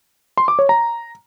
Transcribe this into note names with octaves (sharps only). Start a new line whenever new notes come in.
C6
D6
C#5
A#5